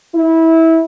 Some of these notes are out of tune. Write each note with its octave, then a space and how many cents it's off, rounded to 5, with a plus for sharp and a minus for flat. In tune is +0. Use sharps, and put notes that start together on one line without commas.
E4 -20